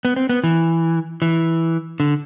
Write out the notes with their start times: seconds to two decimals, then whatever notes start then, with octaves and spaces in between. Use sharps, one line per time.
0.05 B3
0.16 C4
0.29 B3
0.44 E3
1.22 E3
2.00 D3